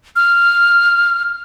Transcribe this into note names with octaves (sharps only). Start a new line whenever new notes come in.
F6